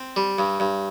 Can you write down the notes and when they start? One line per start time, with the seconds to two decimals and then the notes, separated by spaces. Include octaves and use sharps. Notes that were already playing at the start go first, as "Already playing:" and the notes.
Already playing: C4
0.16 G3
0.39 G2
0.60 G2